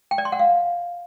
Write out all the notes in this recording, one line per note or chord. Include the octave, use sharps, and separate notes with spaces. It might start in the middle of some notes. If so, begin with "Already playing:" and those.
G5
D5
C6
F#5
F5